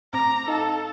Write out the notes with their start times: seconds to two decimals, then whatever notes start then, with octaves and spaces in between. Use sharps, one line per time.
0.13 A2 C4 A#5 D6
0.48 D#4 A4 F5 A5